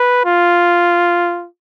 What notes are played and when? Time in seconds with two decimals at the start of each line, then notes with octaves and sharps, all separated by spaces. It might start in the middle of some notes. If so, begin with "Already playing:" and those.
Already playing: B4
0.25 F4